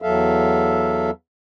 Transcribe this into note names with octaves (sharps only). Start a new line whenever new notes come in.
E2 F#3 A4 E5 F5